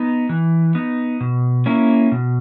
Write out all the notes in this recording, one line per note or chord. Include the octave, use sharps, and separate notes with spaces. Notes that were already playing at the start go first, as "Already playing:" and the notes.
Already playing: B3 D#4
E3
B3 D#4
B2
A#3 C#4 E4
B2